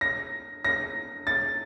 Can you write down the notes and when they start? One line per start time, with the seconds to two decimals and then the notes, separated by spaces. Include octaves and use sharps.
0.01 A#6
0.65 A#6
1.27 A6